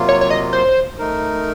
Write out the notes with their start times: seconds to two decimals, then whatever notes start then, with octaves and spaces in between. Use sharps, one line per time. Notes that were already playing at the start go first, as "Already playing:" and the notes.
Already playing: C3 F#3 A#3 F4
0.09 C#5
0.21 C#5
0.30 D#5
0.53 C5
0.99 A3 D#4 A#4